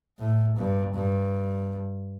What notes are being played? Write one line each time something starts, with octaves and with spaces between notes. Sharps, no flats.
A2
G2
G2